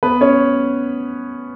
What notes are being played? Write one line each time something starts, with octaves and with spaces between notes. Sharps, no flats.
B3 B4
C#4 C#5